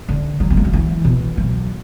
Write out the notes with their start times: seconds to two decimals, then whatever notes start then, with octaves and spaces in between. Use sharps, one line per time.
0.09 D3
0.40 F#3
0.50 B3
0.57 A3
0.65 F#3
0.73 E3
1.05 B2
1.37 F#3